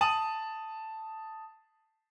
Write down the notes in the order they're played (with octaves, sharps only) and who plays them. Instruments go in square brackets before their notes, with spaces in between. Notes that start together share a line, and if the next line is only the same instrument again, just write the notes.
[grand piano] A5 D#6 D#7 F#7